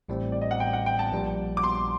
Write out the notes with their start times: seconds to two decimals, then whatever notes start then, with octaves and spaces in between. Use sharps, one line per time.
0.09 A1 A2 G3 C4
0.32 D5
0.41 D#5
0.51 F#5
0.60 G5
0.73 F#5
0.86 G5
0.99 A5
1.12 A#1 A#2 G3
1.57 D6
1.64 C6